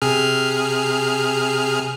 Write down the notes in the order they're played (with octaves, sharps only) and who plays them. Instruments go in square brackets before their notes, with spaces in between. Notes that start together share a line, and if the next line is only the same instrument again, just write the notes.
[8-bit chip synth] C3 G#4 F6